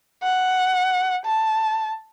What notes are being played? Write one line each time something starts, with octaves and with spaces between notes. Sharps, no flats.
F#5
A5